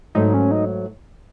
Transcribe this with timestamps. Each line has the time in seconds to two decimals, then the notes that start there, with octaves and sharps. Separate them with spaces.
0.15 G#2 F#3 A3 D#4
0.34 C#4
0.51 D#4